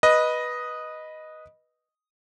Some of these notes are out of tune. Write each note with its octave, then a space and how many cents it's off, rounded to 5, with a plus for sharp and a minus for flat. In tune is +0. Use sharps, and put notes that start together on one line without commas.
B4 -10 D#5 +0